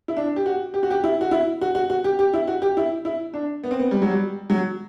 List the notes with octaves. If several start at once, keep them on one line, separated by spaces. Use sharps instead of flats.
E4
D4
G4
F#4
G4
F#4
G4
E4
F#4
E4
F#4
F#4
F#4
G4
G4
E4
F#4
G4
E4
E4
D4
B3
C4
B3
G3
F#3
G3
F#3